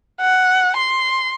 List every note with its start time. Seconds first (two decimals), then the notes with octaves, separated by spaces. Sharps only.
0.21 F#5
0.77 C6